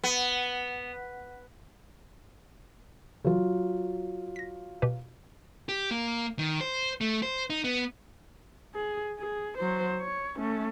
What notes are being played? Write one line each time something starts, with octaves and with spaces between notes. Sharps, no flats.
B3
C#3 E3 F#3 F4
A#6 B6
B2 G4 B4
G4
A#3
D#3
C5
A3
C5
D#4
B3
G#4
G#4
F#3 C5
C#5
A3 C#4